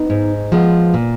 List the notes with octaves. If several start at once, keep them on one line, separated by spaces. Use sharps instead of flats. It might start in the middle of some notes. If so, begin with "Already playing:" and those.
Already playing: B3 D#4
G#2
F3 G#3 B3
A#2